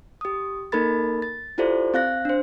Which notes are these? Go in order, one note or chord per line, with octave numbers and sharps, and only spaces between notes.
G4 D#6
A#3 D#4 A4 A#4 B5 A6
A6
E4 F4 G4 A4 C5 D5
C4 F5 F#6 A#6
D4 C5